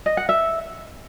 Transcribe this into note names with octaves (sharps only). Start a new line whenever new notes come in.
D#5
F#5
E5